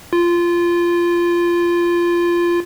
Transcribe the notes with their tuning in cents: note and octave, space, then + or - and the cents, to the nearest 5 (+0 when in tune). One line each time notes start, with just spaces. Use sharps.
F4 -15